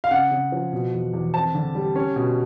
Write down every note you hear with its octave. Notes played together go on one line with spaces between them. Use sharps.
F5
C#3 F#5
C#3
F3
B2
E2
E2
C4 A5
D3
G3
C#4
B2